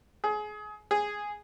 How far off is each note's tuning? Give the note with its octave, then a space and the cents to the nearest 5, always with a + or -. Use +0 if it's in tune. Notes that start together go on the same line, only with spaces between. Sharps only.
G#4 +25
G#4 -5